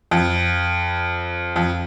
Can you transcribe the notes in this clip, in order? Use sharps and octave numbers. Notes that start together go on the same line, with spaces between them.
F2
F2